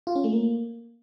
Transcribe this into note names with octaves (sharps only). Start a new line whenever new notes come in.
F4
C#4
A3
A#3